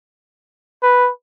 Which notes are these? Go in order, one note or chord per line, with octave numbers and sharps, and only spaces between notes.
B4